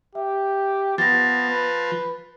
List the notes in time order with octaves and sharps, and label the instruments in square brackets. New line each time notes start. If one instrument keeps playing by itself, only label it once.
[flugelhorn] G4 [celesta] E5
[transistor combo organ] F3 [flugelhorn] B3 [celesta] A6 A#6
[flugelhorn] B4